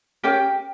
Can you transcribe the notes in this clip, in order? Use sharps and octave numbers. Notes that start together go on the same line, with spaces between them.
C#4 G4 A#4 G5